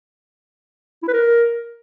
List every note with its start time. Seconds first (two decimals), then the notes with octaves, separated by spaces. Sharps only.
1.03 E4
1.08 B4
1.13 A#4